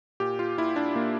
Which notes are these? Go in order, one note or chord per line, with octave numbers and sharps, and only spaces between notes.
A#2 G4
F4
A#2 E4
D4
A#2 A#3